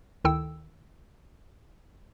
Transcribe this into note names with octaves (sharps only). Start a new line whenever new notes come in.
D2 D#3 E4 A4 G5 E6